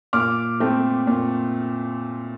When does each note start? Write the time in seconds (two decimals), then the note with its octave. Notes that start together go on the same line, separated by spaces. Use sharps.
0.13 A#2 D6 F6
0.60 A3 C4
1.07 A#2